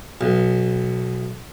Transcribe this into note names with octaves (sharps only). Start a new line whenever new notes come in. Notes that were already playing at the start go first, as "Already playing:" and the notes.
B1